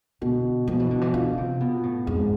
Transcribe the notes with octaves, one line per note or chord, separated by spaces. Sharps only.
B2 D3
B2 F3
E3
D3
E3
D3 F4
C3
B2 B3
A2
F2 G#2